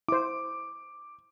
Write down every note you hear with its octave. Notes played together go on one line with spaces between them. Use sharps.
E4 C5 D6